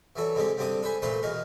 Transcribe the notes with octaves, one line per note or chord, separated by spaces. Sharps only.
E3 F#3 A4 D5
D3 G#3 C4 D#4 G4
G2 D3 C4 D4 D6 D#6
A4 B4 C5 G#5
A#2 E3 A3 B4 C5 C6
E2 B2 D#4 A#4